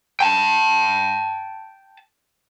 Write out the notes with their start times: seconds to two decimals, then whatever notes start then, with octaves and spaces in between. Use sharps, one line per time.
0.20 G5 A5